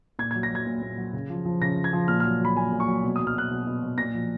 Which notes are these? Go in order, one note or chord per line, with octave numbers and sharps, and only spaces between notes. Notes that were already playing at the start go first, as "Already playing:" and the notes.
A#2 G#6
G#6
F#3
A#6
F#3 G#6
A#2
A#2
F#3
C#3
F3
F3
C#3 A#6
C#3
G#6
F3
A#2 F6
F6
F#3
F#3 B5
A#2 G#5
A#2
C#6
F#3
B2
D#6
F#3
F6
F#3 F#6
B2
B2
F#3
A#2 A#6
F3